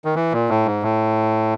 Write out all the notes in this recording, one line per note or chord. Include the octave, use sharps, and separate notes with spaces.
D#3
E3
A#2
A2
G#2
A2